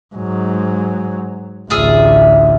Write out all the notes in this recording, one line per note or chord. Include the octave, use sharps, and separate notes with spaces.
G#2 F#3
A1 D2 F4 G#4 E5